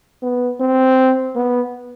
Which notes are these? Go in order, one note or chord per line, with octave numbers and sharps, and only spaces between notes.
B3
C4
B3